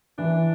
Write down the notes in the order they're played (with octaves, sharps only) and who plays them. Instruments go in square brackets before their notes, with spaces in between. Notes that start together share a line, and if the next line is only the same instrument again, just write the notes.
[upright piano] E3 [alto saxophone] D4